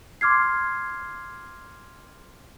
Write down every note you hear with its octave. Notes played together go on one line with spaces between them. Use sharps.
C6 D6 F6 G#6 C7